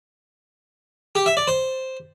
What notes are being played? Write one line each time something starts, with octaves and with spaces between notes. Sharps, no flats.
G4
E5
D5
C5